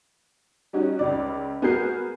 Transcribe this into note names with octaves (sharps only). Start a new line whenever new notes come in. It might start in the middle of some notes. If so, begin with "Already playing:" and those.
G3 C#4 D#4 F#4
C#2 C#3 D5
B3 F#4 G#4 A#4 G6 C7